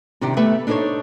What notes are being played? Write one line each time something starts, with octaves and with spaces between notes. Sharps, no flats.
C3 D#3 D4 G4
A3 B3 G4 B4 E5
D4 D#4 A4 A#4 C5 C#5